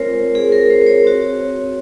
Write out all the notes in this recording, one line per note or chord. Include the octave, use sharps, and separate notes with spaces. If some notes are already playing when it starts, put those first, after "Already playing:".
Already playing: G#3 C4 F4 A#4 C5 C#5
G#4
A#4
C5
C5
C#5
C4 F#4